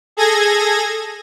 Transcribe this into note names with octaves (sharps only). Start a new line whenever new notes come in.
G#4 A4 G#6 A#6